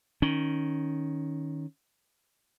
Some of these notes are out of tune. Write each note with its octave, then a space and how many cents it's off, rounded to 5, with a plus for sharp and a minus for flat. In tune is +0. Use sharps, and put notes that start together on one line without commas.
D#3 +0 C#4 +5